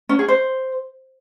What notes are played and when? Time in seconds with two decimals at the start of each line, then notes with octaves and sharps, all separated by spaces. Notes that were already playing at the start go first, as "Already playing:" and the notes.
0.09 C#4
0.19 G#4
0.28 C5